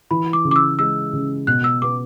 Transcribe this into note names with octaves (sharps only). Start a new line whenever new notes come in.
E3 B5
D6
C#3
D6
E6
G#3 E6
C#3
B2 F#6
E6
B3 D6